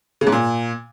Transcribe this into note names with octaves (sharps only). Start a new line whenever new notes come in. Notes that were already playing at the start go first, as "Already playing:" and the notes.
C#3
G#2
A#2